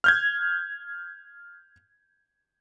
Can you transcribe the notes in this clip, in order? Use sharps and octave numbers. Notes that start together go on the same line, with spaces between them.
F6 G6 G#6